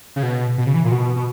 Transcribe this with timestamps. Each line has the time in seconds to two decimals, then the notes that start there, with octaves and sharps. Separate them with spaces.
0.16 C#3
0.23 B2
0.58 B2
0.66 C#3
0.74 E3
0.85 A#2
0.91 B2
1.16 B2